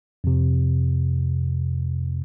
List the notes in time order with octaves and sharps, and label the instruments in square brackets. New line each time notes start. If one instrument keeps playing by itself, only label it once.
[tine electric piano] F2 C3